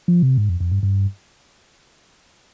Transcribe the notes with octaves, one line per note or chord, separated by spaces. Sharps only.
F3
C3
G#2
F2
F2
G2
G2